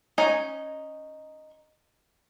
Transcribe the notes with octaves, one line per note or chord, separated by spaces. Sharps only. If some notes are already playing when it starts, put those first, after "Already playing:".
C#4 D#4 G#5 A#5